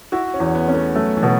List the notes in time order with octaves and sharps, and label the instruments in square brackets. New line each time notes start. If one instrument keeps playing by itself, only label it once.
[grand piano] E4 [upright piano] F#4
[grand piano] C#4
[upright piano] E2
[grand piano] B3
[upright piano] C#4
[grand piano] A3
[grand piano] F#3 [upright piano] A3
[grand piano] E3
[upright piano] B2